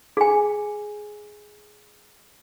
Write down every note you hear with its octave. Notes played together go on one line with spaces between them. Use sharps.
G#4 G#5